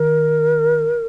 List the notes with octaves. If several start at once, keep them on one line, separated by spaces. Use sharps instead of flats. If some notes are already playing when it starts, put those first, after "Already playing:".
Already playing: D#3 A#4